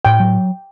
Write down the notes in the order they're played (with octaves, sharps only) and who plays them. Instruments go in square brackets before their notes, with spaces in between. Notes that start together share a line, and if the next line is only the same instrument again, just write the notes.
[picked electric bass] A2 [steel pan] G5
[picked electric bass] F#3